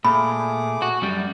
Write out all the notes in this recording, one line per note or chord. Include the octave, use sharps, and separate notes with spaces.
A#2 A3 G#4 B5 D6
F#4
F#2 G3